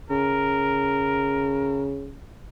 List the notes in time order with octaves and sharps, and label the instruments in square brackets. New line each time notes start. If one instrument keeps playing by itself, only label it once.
[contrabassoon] C#3 [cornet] A#4